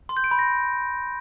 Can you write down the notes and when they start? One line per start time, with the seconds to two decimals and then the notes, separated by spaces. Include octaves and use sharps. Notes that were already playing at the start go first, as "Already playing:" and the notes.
0.09 C6
0.17 G6
0.24 D7
0.31 B5
0.39 A#6